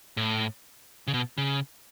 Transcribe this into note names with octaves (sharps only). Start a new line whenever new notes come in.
A2
C#3
B2
C#3